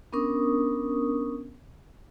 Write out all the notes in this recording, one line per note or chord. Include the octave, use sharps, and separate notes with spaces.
B3 C#4 D4 A#4 C#6 D#6